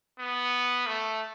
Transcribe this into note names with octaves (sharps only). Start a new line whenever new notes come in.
B3
A3